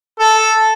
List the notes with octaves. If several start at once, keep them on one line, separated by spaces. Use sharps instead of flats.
A4